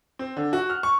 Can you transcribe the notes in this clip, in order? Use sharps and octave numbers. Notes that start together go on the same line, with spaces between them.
C4
D3
F#4
F6
C#6